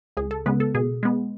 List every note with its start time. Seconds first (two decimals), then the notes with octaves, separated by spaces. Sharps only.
0.17 C#2 G#4
0.31 A4
0.46 C#3 G#3 B3 B4
0.60 A4
0.74 B2 G#4
1.03 G#3 B3